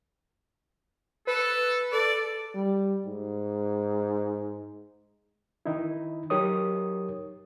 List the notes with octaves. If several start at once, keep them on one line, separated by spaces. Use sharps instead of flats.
A4 B4
A4 D5
G3
G#2
D#3 D#4 E4
F#3 D#4 G4 A#4 C#5 D#6